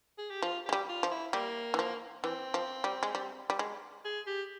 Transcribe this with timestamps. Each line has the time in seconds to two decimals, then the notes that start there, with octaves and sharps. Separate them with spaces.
0.18 G#4
0.30 G4
0.42 F3 F4
0.66 G#3 G4
0.73 G3
0.88 F4
1.03 F3
1.11 E4
1.33 G3 A#3
1.74 E3
1.79 F3
2.23 E3 C4
2.54 F3
2.84 G3
3.03 G#3
3.15 G3
3.50 G3
3.59 G#3
4.05 G#4
4.27 G4